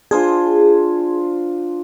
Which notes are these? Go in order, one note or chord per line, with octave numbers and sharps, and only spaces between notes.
D4 F4 G#4 C5